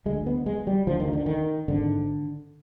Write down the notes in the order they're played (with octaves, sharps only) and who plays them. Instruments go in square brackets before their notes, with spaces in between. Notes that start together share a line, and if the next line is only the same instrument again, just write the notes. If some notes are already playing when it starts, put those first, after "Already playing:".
[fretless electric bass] D2 D3 G#3
B3
G#3
G3
D2 D3 F3
D#3
D3
D#3
G#1 G#2 D3